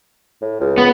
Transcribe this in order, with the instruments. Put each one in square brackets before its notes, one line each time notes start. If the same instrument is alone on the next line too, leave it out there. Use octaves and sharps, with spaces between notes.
[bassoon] A2
C#2
[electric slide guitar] B3